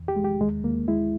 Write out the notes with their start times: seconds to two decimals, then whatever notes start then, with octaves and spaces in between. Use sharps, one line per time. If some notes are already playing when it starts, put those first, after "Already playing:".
Already playing: E2
0.08 G4
0.16 G#3
0.24 G4
0.40 D#2 G#3
0.64 D#2 A#3
0.88 G#3 E4